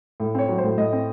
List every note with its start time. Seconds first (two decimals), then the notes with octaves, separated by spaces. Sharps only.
0.20 A2
0.35 C4 C#5
0.49 F#3
0.58 C5
0.63 A2
0.78 A2 D#5
0.93 C4